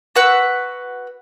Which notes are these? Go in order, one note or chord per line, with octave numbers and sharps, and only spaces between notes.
F#4 B4 F#5 E6